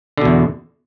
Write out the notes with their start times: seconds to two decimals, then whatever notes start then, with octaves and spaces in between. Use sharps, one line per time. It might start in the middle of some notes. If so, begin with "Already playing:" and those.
0.17 D3
0.21 B2
0.25 E2